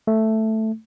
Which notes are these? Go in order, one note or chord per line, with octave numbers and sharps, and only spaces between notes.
A3